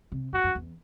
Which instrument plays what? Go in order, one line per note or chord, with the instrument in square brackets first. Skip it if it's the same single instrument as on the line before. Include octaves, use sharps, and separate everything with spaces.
[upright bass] C3
[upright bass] F#2 [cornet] F#4
[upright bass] F#2
E2